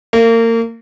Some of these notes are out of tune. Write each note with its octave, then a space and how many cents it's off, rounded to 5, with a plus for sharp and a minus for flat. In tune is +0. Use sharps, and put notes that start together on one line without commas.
A#3 -30